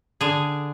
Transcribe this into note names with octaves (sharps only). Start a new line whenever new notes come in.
D3 G#4